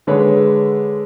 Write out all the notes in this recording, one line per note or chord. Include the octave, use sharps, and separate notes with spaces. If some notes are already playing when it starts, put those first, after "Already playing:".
D3 G#3 B4 C#5